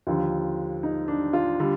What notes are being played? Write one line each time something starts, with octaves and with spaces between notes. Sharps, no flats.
D#2 D3 F3 F4
D#4
D4
F4
D3 G3